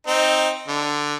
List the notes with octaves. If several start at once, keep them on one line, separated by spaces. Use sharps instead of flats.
C4 D#4
D3